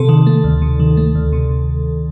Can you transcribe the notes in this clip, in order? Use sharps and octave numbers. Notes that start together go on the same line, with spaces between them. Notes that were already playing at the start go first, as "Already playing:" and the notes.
Already playing: C3 A4
D#3
A3
D2
C3
D#3
A3
D2
C3